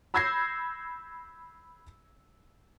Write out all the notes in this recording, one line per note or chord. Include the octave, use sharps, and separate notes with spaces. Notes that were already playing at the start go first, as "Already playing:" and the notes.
B5 E6 G6 G#6 A#6 C7